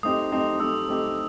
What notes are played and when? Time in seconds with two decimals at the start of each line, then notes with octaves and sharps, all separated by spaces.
0.03 A3 C4 D#4 G4 D#6
0.32 A3 C4 D#4 G4
0.60 A3 C4 D#4 G4 E6
0.88 A3 C4 D#4 G4